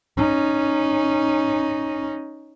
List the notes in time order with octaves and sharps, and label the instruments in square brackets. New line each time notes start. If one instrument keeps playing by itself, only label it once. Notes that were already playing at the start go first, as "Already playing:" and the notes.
[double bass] C#4 D#4